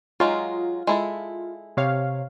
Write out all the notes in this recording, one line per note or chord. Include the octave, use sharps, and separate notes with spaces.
F#3 G#3 D#4 F4
G#3 E4 A4
C3 C#5 F5